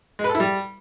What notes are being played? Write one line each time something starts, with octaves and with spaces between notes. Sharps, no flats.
G#3
B4
A4
E4
G3